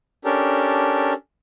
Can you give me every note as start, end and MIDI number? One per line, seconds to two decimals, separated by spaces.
0.25 1.14 61
0.25 1.14 62
0.25 1.14 67
0.25 1.14 69
0.25 1.14 70